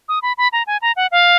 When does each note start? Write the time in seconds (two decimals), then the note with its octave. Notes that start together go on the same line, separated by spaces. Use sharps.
0.09 D#6
0.22 B5
0.38 B5
0.52 A#5
0.67 G#5
0.82 A#5
0.96 F#5
1.12 F5